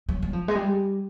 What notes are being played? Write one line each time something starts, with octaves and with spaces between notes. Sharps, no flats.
F#3
F#3
F3
G#3
G3